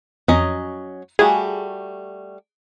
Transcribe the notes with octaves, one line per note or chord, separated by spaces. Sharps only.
F2 F#3 C#4 D#5
G3 A3 F#4 G#4